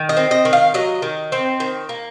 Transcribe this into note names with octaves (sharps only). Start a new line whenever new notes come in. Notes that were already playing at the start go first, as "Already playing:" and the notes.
Already playing: D#3
D#5
C4
D#5
D#3
F5
F#3 D#5
D#3
C4
D#3
A#3